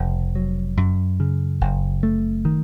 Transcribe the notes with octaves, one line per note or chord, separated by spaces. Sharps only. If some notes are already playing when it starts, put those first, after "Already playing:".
Already playing: F1 C#3
F#3
F#2
C#3
F#1
A3
D#3